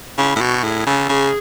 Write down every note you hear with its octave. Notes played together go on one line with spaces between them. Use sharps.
C#3 E4
A2
B2 F#4
A2 G#4
C#3 A4
C#3 G#4